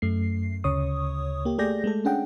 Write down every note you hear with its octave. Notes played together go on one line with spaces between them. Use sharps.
F#2 A3 C7
D2 C#3 C#5 C#6 D#6
A#3 G4
A3 G4 G#4 D5 G6 A#6
G#3 A3 A4
C#4 D4 G#4 F#5 G5